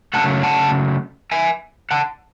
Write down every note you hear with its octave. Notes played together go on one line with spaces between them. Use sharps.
C#3 F#3 A3 F#5 A5
F#5 A5
E5 G#5
F#5 A5